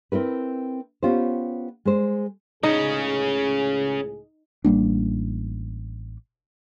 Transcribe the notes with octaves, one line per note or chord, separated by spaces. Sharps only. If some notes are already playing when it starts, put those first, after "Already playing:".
C4 E4 A#4 B4
B3 C#4 F4 G4 C5
G#3 C5
C#2 A2 C#3 C#4 D#4 G#4
A1 G3 A#3 D4